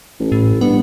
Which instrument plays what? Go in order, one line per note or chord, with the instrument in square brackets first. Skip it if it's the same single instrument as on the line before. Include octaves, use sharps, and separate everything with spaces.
[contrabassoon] A1
[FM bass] A2
[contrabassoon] G2 [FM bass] B3